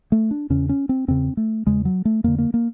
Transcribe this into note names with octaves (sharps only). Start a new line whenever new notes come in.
A3
D4
E2 C#3 C#4
C#4
C4
E2 C#3 C4
A3
E2 C#3 G#3
F#3
A3
F2 D3 A#3
A#3
A#3